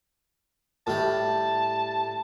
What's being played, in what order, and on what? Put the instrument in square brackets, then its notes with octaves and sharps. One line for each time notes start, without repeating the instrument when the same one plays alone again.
[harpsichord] A2 G3 [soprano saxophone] A5